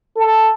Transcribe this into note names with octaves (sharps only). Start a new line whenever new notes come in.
A4